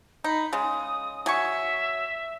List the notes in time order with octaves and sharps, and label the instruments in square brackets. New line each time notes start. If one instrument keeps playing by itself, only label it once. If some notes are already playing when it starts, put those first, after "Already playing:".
[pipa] D#4 [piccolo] B5
[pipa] C#3 G#3 [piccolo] D#6
[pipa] F#3 G#5 C#6 [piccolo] E5